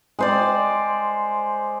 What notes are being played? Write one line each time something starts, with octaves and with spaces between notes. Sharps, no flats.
G#3 C5 D5